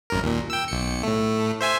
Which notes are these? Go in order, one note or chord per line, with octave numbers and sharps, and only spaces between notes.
G#1 F#2 A#4
D#2 A#2
G5 E6
B1 C#7
A2 A3
C5 E5 G#5